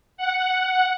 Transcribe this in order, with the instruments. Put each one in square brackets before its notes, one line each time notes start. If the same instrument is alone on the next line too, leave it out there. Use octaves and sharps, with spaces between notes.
[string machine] F#5